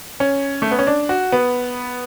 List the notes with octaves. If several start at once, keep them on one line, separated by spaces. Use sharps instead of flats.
C#4
A3
B3
C#4
D4
F#4
B3